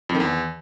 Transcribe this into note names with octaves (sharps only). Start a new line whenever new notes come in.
F2
D#3
E2